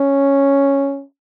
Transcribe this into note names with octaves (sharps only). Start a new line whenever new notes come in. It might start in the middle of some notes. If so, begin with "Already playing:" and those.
Already playing: C#4